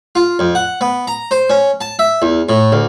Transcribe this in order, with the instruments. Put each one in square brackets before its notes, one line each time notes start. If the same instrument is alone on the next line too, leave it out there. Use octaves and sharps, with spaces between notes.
[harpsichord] F4
F2
F#5
B3
A#5
C5
C#4
A5
E5
E2
A2
D2